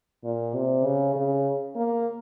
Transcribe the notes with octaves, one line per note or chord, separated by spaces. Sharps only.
A#2
C3
C#3
C#3
A#3